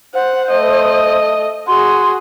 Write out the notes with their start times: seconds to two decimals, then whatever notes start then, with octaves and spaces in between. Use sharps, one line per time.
0.14 C5 F#5
0.50 A3 D#5
1.68 F#4 G#4 C6